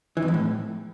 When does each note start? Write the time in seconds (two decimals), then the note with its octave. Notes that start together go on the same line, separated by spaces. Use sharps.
0.17 E3
0.22 F2
0.28 E2
0.34 A2